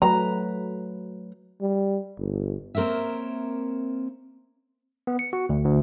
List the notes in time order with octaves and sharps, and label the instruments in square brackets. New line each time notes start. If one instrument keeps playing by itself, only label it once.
[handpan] F#3 A3 B4 [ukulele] A#5
[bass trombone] G3
G1
[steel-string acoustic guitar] A#3 C4 A#4 C#5 E5
[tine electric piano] B3
C#7
F#4
D2
D2